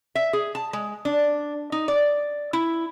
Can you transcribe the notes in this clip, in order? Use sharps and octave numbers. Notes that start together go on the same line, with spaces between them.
E5
G#4
A5
G#3
D4
D#4
D5
E4